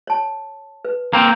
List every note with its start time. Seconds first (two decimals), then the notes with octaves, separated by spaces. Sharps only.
0.07 C#5 A5
0.85 B4
1.13 A#3 C4 A#5